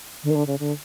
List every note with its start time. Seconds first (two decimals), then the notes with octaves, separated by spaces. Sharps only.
0.23 D3
0.30 D#3
0.35 D3
0.47 C#3
0.59 D3